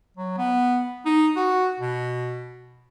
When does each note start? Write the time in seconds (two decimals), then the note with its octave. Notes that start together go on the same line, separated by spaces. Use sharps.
0.17 F#3
0.38 B3
1.05 D#4
1.36 F#4
1.79 B2